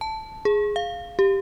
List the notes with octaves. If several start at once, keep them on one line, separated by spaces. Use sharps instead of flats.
A5
G#4
F5
G4